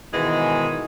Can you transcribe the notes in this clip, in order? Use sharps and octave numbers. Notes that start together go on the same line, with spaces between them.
G#2 B2 D#3 E3 G#3